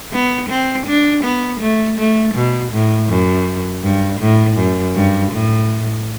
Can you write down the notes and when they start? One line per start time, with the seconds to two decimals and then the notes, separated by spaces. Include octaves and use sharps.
0.12 B3
0.49 C4
0.86 D4
1.24 B3
1.60 A3
1.98 A3
2.35 B2
2.72 A2
3.09 F#2
3.83 G2
4.20 A2
4.57 F#2
4.95 G2
5.32 A2